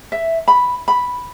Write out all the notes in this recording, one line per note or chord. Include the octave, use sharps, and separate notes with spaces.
E5
B5
B5